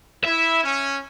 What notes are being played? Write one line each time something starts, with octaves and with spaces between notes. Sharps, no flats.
E4 E5
C#4